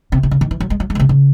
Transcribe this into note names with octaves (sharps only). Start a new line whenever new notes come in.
C3
C3
C#3
D#3
E3
F#3
G#3
F#3
G#3
C#3
C3
C#3